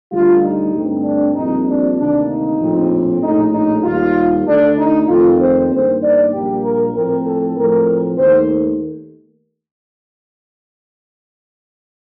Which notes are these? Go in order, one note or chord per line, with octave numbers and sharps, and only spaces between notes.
D2 D3 G3 F4
D#4
G2 D3 A3 C4
D4
A#1 A#2 G3 C4 D#4
D4
D2 C3 D#3 A#3 D4
D#4
A#1 A2 F3 C4
A#1 A2 A3 D#4
D#4
D#2 D#3 G3 F4
D2 D3 A3 D4
D#4
F2 D#3 A3 C4 F4
C5
G2 D#3 A#3 C5
D5
A#1 A#2 G3 A#3 G4
A#4
A2 F3 A3 C4 A#4
A4
A2 F3 A3 C4 A#4
D#2 D#3 A3 C5